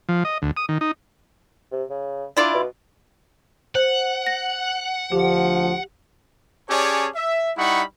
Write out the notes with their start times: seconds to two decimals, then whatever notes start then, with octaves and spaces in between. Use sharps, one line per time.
0.09 F3
0.25 D#5
0.42 D2
0.57 D#6
0.69 D#3
0.81 D#4
1.72 C3
1.90 C#3
2.37 D4 E4 F4 D5
2.54 B2
3.75 C5 F#5
4.27 A#6
5.12 D2 F3 G4
6.69 C#4 G4 G#4 C#5 D5 A5
7.15 E5
7.56 G3 D#4 E4 F#5 B5 C#6